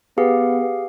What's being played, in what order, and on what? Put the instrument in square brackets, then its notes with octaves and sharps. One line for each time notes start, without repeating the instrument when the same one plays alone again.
[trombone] B3 [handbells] G4 G#4 F5